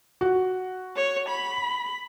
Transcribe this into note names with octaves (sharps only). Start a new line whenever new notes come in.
F#4
C#5
B5